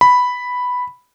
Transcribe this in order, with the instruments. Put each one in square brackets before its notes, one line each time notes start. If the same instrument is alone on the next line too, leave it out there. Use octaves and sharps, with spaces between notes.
[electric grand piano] B5